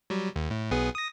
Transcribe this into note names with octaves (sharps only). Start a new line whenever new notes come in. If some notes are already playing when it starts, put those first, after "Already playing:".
F#3 G3
D#2
A2
B1 B3 G#4
D#6 A#6